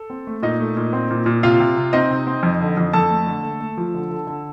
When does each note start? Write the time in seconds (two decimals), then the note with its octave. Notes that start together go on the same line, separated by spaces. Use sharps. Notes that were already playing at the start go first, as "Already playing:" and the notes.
Already playing: A4
0.10 C4
0.27 A3
0.43 A#2 D#4 D#5
0.60 A3
0.77 A#2
0.93 C4
1.10 A#2
1.26 A#2
1.43 C3 F4 F5
1.60 C3
1.77 C3
1.93 C4 D#4 D#5
2.10 C3
2.27 C4
2.43 F2
2.60 D3
2.77 F2
2.93 F2 A4 A5
3.10 A3
3.27 D3
3.43 A3
3.60 A3
3.77 F3
3.94 D3
4.11 D3
4.27 D3